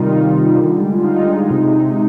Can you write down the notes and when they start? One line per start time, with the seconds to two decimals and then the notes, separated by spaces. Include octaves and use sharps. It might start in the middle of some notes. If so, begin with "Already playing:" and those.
Already playing: C3 D#3 G3 D#4 F4
0.11 D#3
0.35 G3
0.58 D3
0.81 G#3
0.93 F4
1.04 D3 D#4
1.27 G#3
1.50 C3
1.73 C3